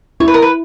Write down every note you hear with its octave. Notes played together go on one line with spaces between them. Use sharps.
E4 C#5
B4
A#4
B4